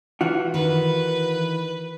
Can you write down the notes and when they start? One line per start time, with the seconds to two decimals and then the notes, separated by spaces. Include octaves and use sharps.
0.21 E3 F4 F#4
0.54 D#3 B4